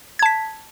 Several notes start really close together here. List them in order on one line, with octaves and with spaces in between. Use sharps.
G#6 A5 B6